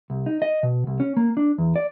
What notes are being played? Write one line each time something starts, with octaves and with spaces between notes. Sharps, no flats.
C2
D#4
D#5
B2
C2
C#4
A#3
D4
E2
D5